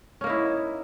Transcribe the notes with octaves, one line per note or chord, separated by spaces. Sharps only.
A#3 C#4 D#4 E4